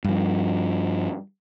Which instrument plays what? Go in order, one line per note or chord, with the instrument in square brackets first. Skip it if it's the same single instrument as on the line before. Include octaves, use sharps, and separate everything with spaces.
[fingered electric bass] G2 F3